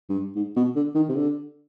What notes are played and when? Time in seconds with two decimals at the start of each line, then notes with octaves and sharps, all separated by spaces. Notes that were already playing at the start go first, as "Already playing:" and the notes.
0.09 G2
0.36 G#2
0.56 B2
0.76 D3
0.95 D#3
1.09 C3
1.16 D3